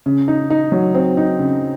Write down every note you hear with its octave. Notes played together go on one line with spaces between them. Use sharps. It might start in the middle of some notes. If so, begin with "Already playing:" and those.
C#3
D#4
D#4
F#3
C4
D#4
C#3